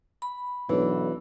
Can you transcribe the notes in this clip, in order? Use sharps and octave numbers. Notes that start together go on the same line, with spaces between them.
B5
B1 E3 D4